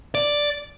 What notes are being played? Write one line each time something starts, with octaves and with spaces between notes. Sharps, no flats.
D5